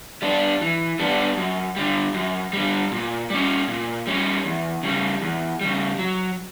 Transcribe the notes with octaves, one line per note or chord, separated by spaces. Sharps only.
G3 B3 D4
E3
G3 B3 D4
F#2
D3 G3
F#2
D3 G3
A#2
G3 C#4
A#2
G3 C#4
E2
C#3 G3
E2
C#3 G3
F#3